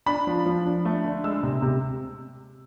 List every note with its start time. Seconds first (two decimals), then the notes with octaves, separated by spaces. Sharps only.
0.06 D4 B5
0.27 F3
0.46 F3
0.65 D4
0.85 A3
1.04 D3
1.24 G#3 E6
1.43 C3
1.62 C3